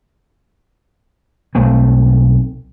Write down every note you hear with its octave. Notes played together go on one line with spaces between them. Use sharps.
B1 A3 C4